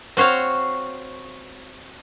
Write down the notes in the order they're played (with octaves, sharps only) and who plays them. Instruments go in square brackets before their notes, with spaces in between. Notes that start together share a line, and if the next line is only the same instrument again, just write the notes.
[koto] C4 F#4 C5 C#5 F5